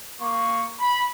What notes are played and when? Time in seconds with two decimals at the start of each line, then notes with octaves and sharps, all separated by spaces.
0.20 A#3 C#6
0.79 B5